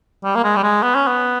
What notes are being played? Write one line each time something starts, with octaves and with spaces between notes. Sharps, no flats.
G3
A#3
G#3
G3
G#3
B3
C#4
B3